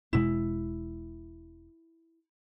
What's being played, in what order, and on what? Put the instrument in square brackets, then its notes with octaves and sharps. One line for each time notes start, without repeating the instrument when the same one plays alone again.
[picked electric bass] E1 B2 G#3 [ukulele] E4